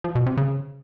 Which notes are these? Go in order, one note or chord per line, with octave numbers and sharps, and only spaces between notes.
F3
B2
C3
C#3